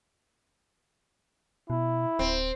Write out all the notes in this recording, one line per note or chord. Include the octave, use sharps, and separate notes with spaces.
B2 E4
D1 C4